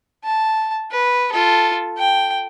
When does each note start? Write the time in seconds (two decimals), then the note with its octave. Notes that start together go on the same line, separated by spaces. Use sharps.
0.24 A5
0.92 B4
1.32 F4 A4
1.97 G5